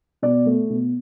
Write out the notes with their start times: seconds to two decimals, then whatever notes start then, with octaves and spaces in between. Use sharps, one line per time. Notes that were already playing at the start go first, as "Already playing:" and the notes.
0.22 B2 D5
0.46 A3
0.70 B2